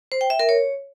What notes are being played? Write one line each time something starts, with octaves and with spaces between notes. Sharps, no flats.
C5
G5
E5
A#4
C#5